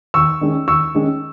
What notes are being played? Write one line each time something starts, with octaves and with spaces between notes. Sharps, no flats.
D#2 C#6 E6
D#3 G#3 C#4
D#2 C#6 E6
D#3 G#3 C#4